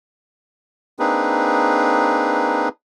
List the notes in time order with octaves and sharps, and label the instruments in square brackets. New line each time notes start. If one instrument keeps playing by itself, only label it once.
[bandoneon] A#3 C4 D4 D#4 G#4 B4